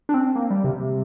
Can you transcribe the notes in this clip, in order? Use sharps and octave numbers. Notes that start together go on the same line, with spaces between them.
D4
C4
A#3
G3
C3